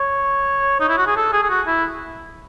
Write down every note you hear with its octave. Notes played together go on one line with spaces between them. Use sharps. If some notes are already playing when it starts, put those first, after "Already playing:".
Already playing: C#5
D#4
E4
F#4
G#4
A4
G#4
G#4
F#4
E4